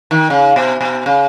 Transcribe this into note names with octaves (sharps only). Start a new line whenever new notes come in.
D#3
C#3
B2
B2
C#3